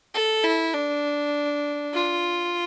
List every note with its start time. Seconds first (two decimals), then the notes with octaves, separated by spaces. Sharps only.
0.14 A4
0.44 E4
0.74 D4
1.94 F4